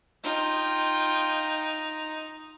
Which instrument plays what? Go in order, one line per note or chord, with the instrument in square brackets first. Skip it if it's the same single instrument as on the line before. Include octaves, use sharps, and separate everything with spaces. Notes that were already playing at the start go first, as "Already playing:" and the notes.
[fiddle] D#4 [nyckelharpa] F4 G5